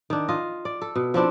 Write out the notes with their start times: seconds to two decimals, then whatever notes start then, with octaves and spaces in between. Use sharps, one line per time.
0.10 D#3 D4
0.28 F4 D#5
0.65 D5
0.82 A4
0.96 B2
1.14 F3 C4 D4 E4